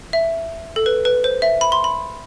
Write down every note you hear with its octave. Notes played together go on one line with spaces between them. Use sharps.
E5
A4
B4
B4
C5
E5
B5
C6
B5